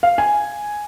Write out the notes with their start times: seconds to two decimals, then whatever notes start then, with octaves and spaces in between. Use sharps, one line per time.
0.03 F5
0.18 G#5